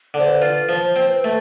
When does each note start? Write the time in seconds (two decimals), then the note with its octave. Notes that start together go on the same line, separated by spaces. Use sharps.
0.14 D3 C5
0.28 B4
0.42 F4
0.69 F3 C5
0.96 C4
1.10 B4
1.24 A3